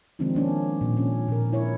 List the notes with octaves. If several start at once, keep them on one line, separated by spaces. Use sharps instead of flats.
D#3 F3 G#3 C4 D4 D#4
A#3 C#4 D4
A#2
C#4
A#2 A#4
E4 C#5